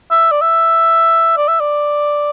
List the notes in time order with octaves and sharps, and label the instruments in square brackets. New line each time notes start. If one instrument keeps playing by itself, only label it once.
[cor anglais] E5
D5
E5
D5
E5
D5